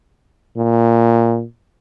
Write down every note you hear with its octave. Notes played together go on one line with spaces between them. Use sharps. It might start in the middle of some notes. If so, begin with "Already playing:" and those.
A#2